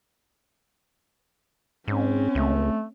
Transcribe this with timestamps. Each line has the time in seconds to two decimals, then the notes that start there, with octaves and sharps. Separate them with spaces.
1.88 G#2 C4 C#4
2.35 C#2 A3